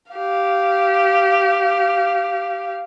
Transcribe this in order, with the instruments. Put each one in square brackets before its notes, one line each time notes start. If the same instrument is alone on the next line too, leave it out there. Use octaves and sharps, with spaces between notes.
[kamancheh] G4 F5